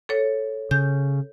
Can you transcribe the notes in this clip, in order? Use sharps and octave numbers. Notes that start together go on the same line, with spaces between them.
A4 C#5
C#3 G6